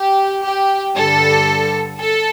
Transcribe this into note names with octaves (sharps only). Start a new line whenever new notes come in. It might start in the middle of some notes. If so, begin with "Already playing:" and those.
Already playing: G4
G4
G2 D3 G3 A4
A4